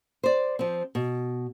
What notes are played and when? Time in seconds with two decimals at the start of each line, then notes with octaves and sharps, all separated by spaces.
0.23 C5 D5
0.59 F3 C4
0.95 B2